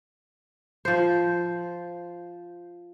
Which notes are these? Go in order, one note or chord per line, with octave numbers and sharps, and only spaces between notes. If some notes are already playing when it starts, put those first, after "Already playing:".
F3 C5